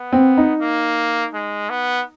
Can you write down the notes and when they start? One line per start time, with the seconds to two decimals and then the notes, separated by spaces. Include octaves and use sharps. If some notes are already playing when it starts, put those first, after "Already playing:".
Already playing: B3
0.13 C4
0.37 D#4
0.61 A#3
1.34 G#3
1.70 B3